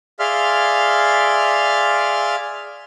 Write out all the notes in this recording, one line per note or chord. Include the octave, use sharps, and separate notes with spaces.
G#4 D5 E5 F5 C6 F6